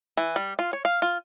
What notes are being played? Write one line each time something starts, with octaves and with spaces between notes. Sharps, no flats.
E3
G3
F4
C#5
F5
F4